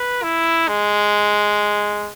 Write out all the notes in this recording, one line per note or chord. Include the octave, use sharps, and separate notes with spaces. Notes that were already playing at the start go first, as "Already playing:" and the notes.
Already playing: B4
E4
G#3